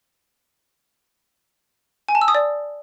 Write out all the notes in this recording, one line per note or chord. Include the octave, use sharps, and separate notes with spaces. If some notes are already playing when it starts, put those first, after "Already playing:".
G#5
A5
E6
D#6
D5